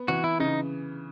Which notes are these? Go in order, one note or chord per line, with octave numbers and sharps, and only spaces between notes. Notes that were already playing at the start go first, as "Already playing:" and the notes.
Already playing: B3
E3 F#4
E4
C#3 D#4